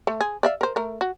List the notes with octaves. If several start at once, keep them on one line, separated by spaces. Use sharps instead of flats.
A3
G#4
D5 E5 F5
A#4 C5
A3 A#4
F#4